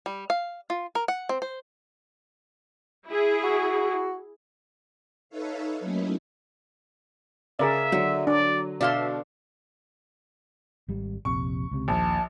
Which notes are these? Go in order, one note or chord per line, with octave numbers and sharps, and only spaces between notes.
G3
F5
F4
A#4
F#5
C4
C5
E4 G#4
F#4
D#4 A4 B4 C#5 E5 F5
F#3 A3 A#3 C#4 D#4 E4
C#3 G#4 A#4 D5 E5
D3 F#3
D4 D5
B2 D4 A4 D5 E5 F5 C6
G#1 G3
F1 A#1 C3 C#6
C#2 C3
A#1 D#2 A5